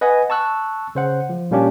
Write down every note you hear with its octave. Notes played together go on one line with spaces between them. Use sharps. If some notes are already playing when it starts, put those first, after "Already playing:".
B4 D#5 F#5 G#5
A5 C#6 E6 F#6
C#3 C5 F#5
F3
A#2 G3 A#3 C#4 D4 G4